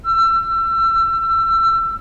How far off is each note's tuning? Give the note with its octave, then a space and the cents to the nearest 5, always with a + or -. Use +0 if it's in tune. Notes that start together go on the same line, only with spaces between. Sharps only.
E6 +30